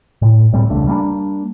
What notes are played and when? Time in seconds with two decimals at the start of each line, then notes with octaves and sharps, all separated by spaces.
0.22 A2
0.53 D2 A2 G3 C4
0.70 E1 C#2 A3 D4
0.87 G3 A#3 B3 D4